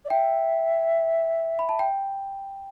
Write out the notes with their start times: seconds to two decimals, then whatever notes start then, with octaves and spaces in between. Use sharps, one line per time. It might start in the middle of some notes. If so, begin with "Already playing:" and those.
0.05 D5
0.10 E5 G5
1.59 B5
1.69 A5
1.79 G5